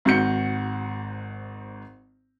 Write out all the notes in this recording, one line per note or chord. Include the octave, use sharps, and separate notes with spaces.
G#1 G#2 F#4 G6 C#7